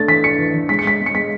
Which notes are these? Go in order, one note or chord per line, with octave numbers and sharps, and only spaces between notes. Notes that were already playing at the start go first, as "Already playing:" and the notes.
Already playing: A3 D4 A6
E3 B6
D4 C#7
E3
E3
G#3 B6
C#7
G#3 B6
G#3
C#7
G#3 B6